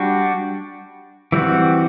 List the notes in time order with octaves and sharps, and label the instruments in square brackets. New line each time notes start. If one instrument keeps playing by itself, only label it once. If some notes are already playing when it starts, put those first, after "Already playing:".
Already playing: [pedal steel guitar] G3 D4 F#4
E3 G3 C4 F#4